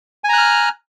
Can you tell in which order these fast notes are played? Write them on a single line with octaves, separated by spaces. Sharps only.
G#5 A#5 F#6 F6